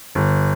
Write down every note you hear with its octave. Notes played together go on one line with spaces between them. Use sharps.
G1